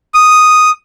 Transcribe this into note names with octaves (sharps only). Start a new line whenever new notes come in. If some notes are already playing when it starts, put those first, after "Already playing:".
D#6